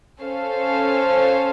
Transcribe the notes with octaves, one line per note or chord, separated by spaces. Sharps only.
C#4 A4 C5 F5